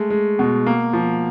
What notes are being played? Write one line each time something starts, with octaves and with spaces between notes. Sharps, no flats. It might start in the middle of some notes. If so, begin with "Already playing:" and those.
Already playing: G#3 A3
G#3
B2
A#3
F3